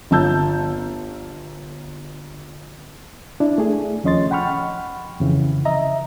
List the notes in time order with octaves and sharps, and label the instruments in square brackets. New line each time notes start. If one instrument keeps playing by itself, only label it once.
[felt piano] G1 F4 A5 E6 G6
[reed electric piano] D4 E4
A3 G#4
D#2 F3 C#4 D#5 C6 A6
F#5 G5 B5 C#6 F6
F2 C#3 E3
D#5 E5 A#5